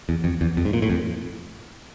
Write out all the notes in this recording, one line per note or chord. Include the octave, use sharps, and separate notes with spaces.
E2
F2
E2
F2
G#2
A#2
A2
F2